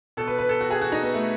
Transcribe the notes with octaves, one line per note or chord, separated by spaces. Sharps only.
B2 A4
B4
B4
A4
F#4
G#4
F#4
D#4
B3
A3